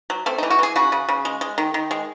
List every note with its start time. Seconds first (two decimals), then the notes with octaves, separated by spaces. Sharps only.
0.10 F#3
0.26 A3 C4
0.38 D#4
0.43 E3
0.50 F#4
0.59 E3 G#4
0.76 C#3 F#4
0.92 C#3
1.09 C#3
1.25 G#3
1.41 G#3
1.58 D#3
1.74 D#3
1.91 G#3